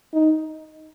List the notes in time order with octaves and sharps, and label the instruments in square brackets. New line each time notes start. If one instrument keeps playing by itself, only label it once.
[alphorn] D#4